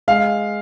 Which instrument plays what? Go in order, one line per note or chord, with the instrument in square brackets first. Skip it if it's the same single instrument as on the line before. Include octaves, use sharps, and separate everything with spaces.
[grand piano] G#3 F5